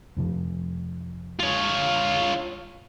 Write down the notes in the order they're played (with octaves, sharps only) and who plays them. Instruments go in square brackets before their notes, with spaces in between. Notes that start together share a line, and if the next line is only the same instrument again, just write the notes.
[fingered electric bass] F2 C3 F3
[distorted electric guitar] F4 C#5